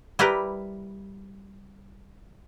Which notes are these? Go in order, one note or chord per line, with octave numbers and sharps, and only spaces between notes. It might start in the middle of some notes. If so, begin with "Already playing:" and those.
G3 E4 G4 A#4 B4